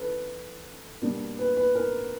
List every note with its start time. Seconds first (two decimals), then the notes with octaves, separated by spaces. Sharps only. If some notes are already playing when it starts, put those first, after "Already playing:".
Already playing: E3 C#4 A4 B4
1.02 B2 G3 A#3 D4
1.38 B4
1.57 B4
1.75 A#4